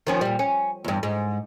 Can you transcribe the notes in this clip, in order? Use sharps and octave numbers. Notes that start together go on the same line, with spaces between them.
D#3 F3 C#4
A#2 G3
C#4
E2 G2
G#2